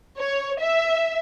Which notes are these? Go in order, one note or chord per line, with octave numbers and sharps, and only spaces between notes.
C#5
E5